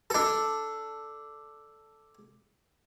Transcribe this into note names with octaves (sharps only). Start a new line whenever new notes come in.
D4 A4